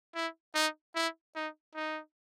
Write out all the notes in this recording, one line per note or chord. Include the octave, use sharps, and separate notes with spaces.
E4
D#4
E4
D#4
D#4